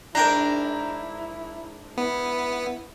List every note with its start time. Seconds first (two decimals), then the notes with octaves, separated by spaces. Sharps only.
0.15 G#2 D4 E4 A#4 G5 A#5
1.98 B3 E4